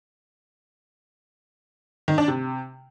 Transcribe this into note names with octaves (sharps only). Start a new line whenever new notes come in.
D#3
D4
C3